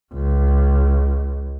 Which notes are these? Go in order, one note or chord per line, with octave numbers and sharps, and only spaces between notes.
C#2